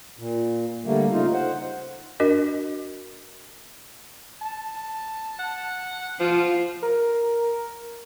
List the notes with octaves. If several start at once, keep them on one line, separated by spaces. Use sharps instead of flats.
A#2
D3 G3 A3 A#3
C#3 D#4 F4
C5 F#5
D4 F#4 A#4 D#5
A5
F#5
F3 F4
A#4